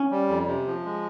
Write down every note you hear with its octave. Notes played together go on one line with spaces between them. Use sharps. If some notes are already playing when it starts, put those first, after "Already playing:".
Already playing: C#4
G3
F2
C3
F3
G#3